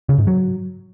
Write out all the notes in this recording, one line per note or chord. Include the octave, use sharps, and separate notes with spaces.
C#3
G#2
F#3